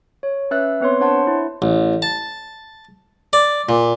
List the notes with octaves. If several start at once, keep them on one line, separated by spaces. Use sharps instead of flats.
C#5
C#4 B4 E5 E6 F#6 A6
B3 C4 B4 C#5 C6
D4 C5 C#5 F#5 A5 C6
E4
A1
A5
D5
A#2